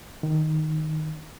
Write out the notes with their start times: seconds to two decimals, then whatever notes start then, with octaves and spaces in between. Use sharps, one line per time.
0.23 D#3